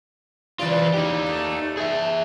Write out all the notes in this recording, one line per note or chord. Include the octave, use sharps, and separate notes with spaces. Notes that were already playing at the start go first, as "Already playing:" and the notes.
C#3 E3 G#3 F4 D5
D#4 G4
A3
G#4 E5